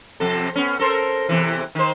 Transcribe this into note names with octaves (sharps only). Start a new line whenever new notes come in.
F2 C3 A4
B3 C#4
A4 A#4 C5
E2 C3 E3
D#3 C5